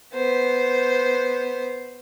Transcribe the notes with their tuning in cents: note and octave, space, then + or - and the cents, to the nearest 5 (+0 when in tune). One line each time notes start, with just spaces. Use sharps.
B3 +0 C5 +0